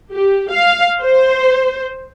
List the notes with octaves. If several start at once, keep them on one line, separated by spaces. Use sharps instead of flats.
G4
F5
C5